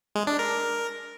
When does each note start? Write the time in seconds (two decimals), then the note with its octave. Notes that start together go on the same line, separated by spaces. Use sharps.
0.16 G#3
0.27 D4
0.39 A#4